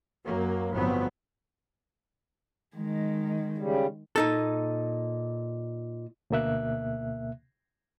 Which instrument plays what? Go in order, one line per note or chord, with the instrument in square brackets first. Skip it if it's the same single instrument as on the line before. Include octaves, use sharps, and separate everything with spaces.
[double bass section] F#2 F#3 A#3
G1 A2 F3 F#3 B3 C4
[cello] D#3 G#3
[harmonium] C#3 G3
[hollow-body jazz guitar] A#2 D#4 A4
[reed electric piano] D2 B2 A#3 E5 F#6